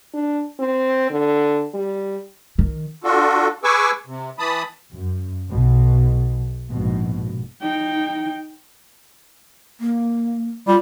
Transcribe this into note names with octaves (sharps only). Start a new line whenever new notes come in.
D4
C4
D3
G3
D#3
D4 F4 F#4 A4
G#4 B4 G#5 C#6 D6 E6
C3
E3 A5 B5 D#6
F#2
B1 B2
A#1 G#2 B2
D#4 G5
A#3
G3 F4